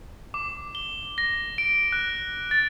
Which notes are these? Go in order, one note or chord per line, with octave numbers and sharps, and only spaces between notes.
D6
G7
A#6
D7
F#6
A6